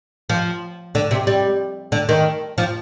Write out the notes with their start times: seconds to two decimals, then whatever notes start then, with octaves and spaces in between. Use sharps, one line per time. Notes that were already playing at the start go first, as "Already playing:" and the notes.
0.30 F3
0.95 D3
1.11 C3
1.27 G3
1.92 D3
2.09 D#3
2.58 F3